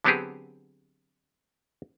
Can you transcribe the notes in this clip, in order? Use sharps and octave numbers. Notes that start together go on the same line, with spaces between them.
D3 F#3 B3 C4 G4 G#4